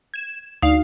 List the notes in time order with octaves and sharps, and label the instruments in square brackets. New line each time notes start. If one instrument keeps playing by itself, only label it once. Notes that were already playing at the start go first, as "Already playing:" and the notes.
[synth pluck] G#6 E7
[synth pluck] D2 F5 [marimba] D#4